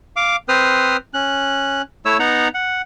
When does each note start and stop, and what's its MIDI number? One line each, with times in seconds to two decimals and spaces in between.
0.16 0.36 77
0.16 0.36 86
0.49 0.97 60
0.49 0.97 71
0.49 0.97 72
0.49 0.97 87
0.49 0.97 89
1.14 1.82 61
1.14 1.82 90
2.05 2.17 57
2.05 2.17 64
2.05 2.17 73
2.05 2.17 88
2.19 2.48 59
2.19 2.48 63
2.19 2.48 78
2.19 2.48 82
2.54 2.82 78